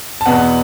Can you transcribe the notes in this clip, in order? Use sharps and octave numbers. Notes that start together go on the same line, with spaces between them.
A5
E2 B2 B3 F#5